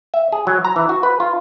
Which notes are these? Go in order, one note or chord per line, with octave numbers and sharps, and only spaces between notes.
E5
G#4
F#3
A#5
E3
F#4
B4
F4